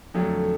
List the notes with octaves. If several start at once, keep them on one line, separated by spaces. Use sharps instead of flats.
F2 D3 F#3 A3